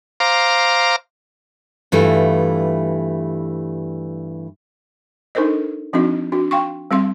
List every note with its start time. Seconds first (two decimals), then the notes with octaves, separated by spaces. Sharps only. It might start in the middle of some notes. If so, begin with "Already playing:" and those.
0.20 C5 F5 A#5 D6
1.92 G2 E3 G3 A3 F4
5.35 D4 D#4 A4 A#4 C5 D#5
5.93 F3 C4 D4 D#4 F#4 D#5
6.32 D4 F#4
6.51 F5 G5 C6 C#6
6.91 G3 C4 F5 C6